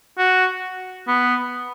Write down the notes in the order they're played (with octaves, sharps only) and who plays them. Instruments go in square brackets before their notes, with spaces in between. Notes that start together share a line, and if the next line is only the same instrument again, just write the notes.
[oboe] F#4
B3